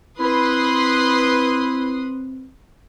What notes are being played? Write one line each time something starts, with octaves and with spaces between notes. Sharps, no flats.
C4 E4 B4 C6 D#6